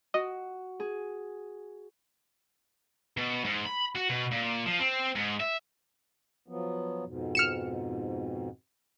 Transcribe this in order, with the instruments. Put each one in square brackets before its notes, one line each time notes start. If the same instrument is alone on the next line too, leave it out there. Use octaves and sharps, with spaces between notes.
[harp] F#4 [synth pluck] D#5
[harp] G#4
[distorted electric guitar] B2
G#2
B5
F#4
B2
A#2
F3
C4
G#2
E5
[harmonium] F3 F#3 B3
F2 G#2 B2
[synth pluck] F6 C#7 E7